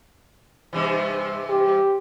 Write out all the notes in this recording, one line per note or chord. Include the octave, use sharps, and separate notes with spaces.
G2 C3 E3
G4